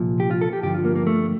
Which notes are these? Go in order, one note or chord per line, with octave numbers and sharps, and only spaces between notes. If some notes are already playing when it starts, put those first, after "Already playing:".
Already playing: C2 A#2 F3
G4
F4
A4
G4
G2 D3 F3 G4
F4
A#3
A#3
A3